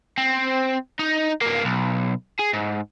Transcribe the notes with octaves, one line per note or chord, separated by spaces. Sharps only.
C4
D#4
G2 A#3
B1
G#4
G#2